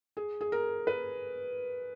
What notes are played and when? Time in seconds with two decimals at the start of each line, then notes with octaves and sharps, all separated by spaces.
0.17 G#4
0.41 G#4
0.52 A#4
0.87 B4